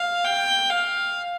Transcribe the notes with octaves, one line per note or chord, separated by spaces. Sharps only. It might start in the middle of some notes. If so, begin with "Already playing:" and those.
Already playing: F5
G5
F5